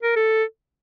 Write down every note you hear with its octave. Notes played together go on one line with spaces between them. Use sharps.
A#4
A4